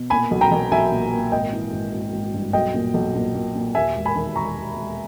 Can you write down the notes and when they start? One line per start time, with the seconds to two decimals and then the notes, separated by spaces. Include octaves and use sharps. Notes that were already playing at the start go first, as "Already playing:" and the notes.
Already playing: B2
0.10 A#2 G#5 B5
0.31 B1
0.41 G5 A#5
0.51 B1
0.71 B1 E5 G#5
0.92 A#2
1.12 A#2
1.32 G#1 D#5 G5
1.52 E3
1.72 G#1
1.93 G#1
2.13 G#1
2.34 G2
2.53 B1 D#5 G5
2.74 A#2
2.94 B1
3.15 A#2
3.35 A#2
3.55 A#2
3.75 D#2 E5 G#5
3.95 E1
4.05 G#5 B5
4.15 D#3
4.36 E1 A#5 C#6
4.57 E1
4.77 E1